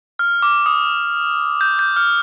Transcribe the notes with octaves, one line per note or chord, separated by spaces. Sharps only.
F6
D6
D#6
G6
G6
F6